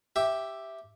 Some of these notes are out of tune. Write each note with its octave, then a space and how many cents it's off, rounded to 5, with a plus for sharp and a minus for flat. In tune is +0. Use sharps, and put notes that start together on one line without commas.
G4 +0 E5 +0